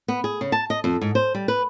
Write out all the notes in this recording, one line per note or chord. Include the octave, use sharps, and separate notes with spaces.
B3
G#4
C#3
A5
D#5
F2
G#2
C5
G3
B4